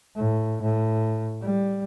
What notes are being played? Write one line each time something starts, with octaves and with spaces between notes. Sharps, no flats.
A2
A2
G3